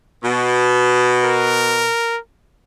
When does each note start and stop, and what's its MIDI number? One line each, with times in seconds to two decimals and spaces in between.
0.23 1.90 47
1.24 2.18 70